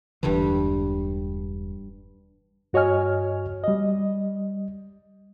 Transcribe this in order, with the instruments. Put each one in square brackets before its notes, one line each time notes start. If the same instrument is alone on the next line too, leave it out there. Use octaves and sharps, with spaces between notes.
[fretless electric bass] E1 D3 E3 [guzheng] G2 G3
[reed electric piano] G2 F#4 C#5 D#5 G#5 F6
G3 D#5